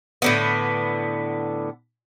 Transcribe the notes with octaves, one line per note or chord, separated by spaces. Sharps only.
A2 D3 B3